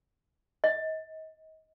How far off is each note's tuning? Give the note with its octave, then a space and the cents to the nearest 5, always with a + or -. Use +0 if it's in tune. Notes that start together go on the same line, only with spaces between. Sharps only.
D#5 +35